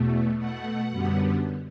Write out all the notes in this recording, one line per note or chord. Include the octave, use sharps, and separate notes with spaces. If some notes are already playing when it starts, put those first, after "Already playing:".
Already playing: E2 B2 A3
B2 A3 F#5
F#2 D3 G3 B3